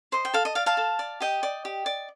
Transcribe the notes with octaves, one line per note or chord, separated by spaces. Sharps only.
C5 D#5
G5
A4 F5
D#5
D5 F5
F5 A5
A4
D5
G4 D#5 G5
D5
G4
D5